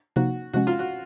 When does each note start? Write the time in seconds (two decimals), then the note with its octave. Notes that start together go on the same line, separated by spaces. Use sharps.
0.16 C3 F3 A#3 D#4 F#4
0.53 C3 F3 G#3 C#4 F#4
0.67 F4
0.79 F#4